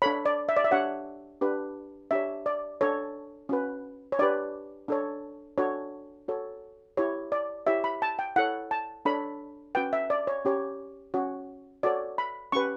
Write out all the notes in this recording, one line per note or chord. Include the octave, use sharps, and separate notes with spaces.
D4 A4 C#5 B5
D5
E5
D5
E5
D4 G4 C#5 F#5
D4 G4 B4
D4 G4 C#5 E5
D5
D4 A4 C#5
C#4 F#4 B4
C#5
D4 G4 B4 D5
D4 A4 C#5
D4 F#4 A4 C#5
F#4 A4 C#5
E4 G4 C#5
D5
E4 G4 C#5 E5
B5
A5
G5
E4 A4 C#5 F#5
A5
D4 A4 C#5 B5
C#4 F#4 B4 G5
E5
D5
C#5
C#4 G4 C#5
C#4 F#4 C#5
F#4 A4 C#5 D5
B5
C#4 G4 B4 C#6